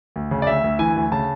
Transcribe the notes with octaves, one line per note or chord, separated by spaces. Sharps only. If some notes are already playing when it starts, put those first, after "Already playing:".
D2
C#3
D5
D2 E5
D2
E3 G#5
D2
C#3 A5